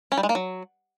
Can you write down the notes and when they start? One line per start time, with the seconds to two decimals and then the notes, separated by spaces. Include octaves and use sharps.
0.12 C#4
0.17 G3
0.23 G#3
0.29 A#3
0.35 F#3